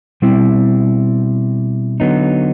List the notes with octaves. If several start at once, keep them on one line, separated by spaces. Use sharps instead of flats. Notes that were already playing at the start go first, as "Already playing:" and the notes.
B2 G3 C4 E4
D3 F#3 B3 D#4